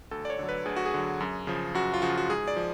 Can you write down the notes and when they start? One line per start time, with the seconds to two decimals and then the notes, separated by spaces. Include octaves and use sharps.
0.11 D2 A4
0.25 D5
0.30 C#5
0.39 D3 F#3
0.49 B4
0.66 D2 G#4
0.76 F#4
0.85 G#4
0.94 D3 F#3
1.20 F#2
1.47 C#3 F3
1.74 F#2 F#4
1.94 F4
2.02 C#3 F3 F#4
2.17 F#4
2.30 G#2 G#4
2.48 D5
2.56 F3